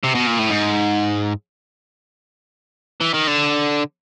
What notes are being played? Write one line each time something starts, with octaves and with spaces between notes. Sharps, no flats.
C3
B2
A#2
A2
G#2
E3
D#3
D3